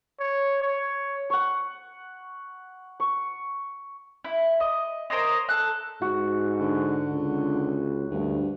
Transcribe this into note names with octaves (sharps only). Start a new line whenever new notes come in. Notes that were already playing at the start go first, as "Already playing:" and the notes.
C#5
C#5
F#5 C#6
C#6
E4
D#5
A#4 C5 C#5 D#5
A4 F#6
G#2 F#4
D3
C#2
D2 G2